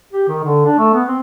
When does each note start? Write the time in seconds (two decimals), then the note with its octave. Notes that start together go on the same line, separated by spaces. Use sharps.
0.13 G4
0.28 D#3
0.44 D3
0.65 D4
0.78 A3
0.93 B3
1.08 C4